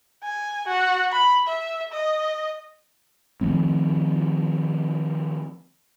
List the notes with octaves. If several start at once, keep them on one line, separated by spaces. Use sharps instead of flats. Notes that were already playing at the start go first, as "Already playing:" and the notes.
G#5
F#4
B5
E5
D#5
D#3 F3 A3 C4